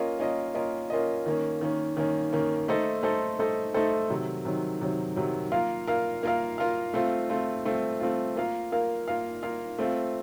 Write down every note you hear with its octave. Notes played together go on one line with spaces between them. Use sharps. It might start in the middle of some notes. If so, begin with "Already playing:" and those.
Already playing: A#3 C#4 F4 A#4 D#5
A#3 C#4 F4 A#4 D#5
A#3 C#4 F4 A#4 D#5
A#3 C#4 F4 A#4 D#5
D#3 A#3 C#4
D#3 A#3 C#4
D#3 A#3 C#4
D#3 A#3 C#4
A3 D#4 A4 C5
A3 D#4 A4 C5
A3 D#4 A4 C5
A3 D#4 A4 C5
C3 D#3 F#3
C3 D#3 F#3
C3 D#3 F#3
C3 D#3 F#3
A#3 F4 A#4 F5
A#3 F4 A#4 F5
A#3 F4 A#4 F5
A#3 F4 A#4 F5
A3 C4 F4
A3 C4 F4
A3 C4 F4
A3 C4 F4
A#3 F4 A#4 F5
A#3 F4 A#4 F5
A#3 F4 A#4 F5
A#3 F4 A#4 F5
A3 C4 F4